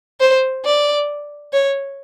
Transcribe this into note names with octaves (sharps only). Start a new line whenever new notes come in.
C5
D5
C#5